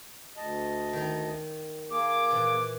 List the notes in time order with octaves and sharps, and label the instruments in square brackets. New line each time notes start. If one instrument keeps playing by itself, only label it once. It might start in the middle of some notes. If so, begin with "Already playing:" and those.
[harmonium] D2 D#5 A5
[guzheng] D#3 D#4
[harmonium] A#3 G#4 [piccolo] D6
[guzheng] A#2 E3